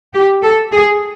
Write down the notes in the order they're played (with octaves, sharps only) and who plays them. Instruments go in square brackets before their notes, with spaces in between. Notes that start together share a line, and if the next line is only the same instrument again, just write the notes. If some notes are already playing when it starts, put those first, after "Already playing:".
[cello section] G4
A4
G#4